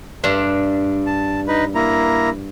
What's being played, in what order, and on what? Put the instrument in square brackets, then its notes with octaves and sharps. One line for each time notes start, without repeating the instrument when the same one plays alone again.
[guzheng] G2 D4 E5
[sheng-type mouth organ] A5
D#4 B4
A#3 E4 A#5